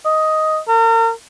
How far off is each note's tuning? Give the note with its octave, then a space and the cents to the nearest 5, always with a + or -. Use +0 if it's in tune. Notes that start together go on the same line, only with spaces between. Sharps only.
D#5 +5
A#4 -40